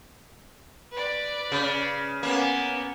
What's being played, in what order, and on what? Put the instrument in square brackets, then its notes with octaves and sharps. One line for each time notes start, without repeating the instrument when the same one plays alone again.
[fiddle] B4 D5
[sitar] C#3
[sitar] A#3 [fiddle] B3 C#4